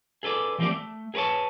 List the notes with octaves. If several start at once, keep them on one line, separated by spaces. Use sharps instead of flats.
G#4 A4 B4 D5
E3 F3 A#3 C4 G4 D5
A3
G#4 A#4 B4 C#5 A5